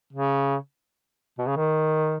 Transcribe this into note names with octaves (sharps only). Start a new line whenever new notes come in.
C#3
B2
C#3
D#3